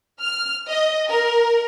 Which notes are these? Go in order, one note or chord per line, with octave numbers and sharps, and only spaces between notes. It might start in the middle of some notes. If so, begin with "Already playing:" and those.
F6
D#5
A#4